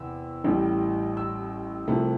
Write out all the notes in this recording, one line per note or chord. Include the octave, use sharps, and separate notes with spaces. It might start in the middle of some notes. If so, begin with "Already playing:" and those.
Already playing: E2 C3 E6
A1 A2 G3
E6
C2 C3 F3 A3